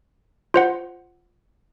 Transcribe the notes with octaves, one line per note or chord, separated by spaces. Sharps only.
F4 C5 F#5